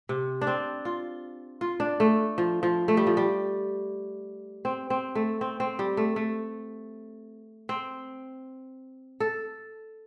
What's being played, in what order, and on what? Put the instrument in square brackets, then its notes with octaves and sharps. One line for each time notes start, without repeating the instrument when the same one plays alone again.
[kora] C3
D4
C4
F4
F4
D4
A3
F3
F3
A3
G3
F3
G3
C4
C4
A3
C4
C4
G3
A3
A3
C4
A4